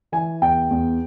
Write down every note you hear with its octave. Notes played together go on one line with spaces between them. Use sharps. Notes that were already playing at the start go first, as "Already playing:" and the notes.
E3 G#5
E2 G5
E2